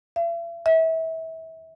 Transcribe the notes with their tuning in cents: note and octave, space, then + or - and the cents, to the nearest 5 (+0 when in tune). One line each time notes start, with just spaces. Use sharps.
E5 +45
E5 -30